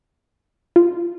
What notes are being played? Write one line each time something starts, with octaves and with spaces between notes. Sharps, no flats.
F4